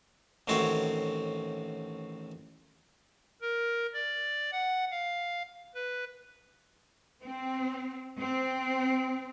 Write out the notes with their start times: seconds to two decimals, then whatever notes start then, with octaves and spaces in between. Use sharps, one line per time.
0.48 A1 A2 D#3 C4 F#4 C#5
3.41 A#4
3.94 D5
4.52 F#5
4.91 F5
5.75 B4
7.22 C4
8.21 C4